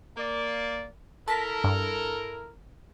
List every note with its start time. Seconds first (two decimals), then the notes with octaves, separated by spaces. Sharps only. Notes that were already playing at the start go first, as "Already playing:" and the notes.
0.17 A#3 D5
1.28 E4 A4 A#4 A5 A#6 B6
1.64 G2